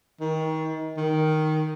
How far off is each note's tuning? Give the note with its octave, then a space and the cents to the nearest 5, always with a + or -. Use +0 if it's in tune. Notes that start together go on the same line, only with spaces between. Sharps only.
D#3 +30
D#3 +0